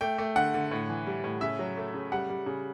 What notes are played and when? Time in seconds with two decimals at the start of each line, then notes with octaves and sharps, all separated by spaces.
0.01 A3 G5
0.18 A3
0.36 D3 F#5
0.54 D3
0.71 A2
0.89 E3
1.07 G3
1.24 A2
1.41 C#3 E5
1.59 F#3
1.77 A3
1.94 C#3
2.12 G3 F#5
2.30 G3
2.46 C#3